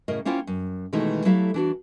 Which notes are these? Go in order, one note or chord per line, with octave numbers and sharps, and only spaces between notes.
A2 C#3 A#4 D#5
A#3 C#4 E4 F4 C5 G5
F#2
B2 D#3 E3 G#3 A3 D#4
F#3 A3 E4 G4 A4 F5
E3 D4 F#4